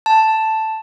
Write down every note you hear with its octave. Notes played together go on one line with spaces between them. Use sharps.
A5